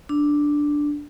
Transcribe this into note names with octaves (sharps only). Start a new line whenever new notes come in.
D4